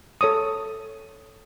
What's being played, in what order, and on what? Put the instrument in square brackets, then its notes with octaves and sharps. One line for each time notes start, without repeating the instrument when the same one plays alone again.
[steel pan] A4 C#5 C#6 D#6